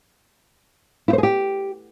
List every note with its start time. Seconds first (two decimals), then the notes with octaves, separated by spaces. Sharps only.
1.08 E4
1.13 C5
1.18 G#4
1.23 G4